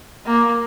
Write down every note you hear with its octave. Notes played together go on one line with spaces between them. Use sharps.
A#3